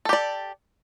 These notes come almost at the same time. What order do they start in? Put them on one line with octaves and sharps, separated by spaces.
A4 G4 D5